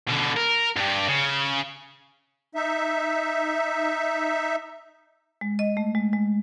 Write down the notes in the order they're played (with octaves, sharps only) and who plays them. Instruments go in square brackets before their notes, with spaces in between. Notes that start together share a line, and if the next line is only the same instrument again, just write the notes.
[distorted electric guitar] B2 D3
A#4
G2 G4
C#3
[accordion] D#4 E5
[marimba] G#3
D#5
A3
G#3
G#3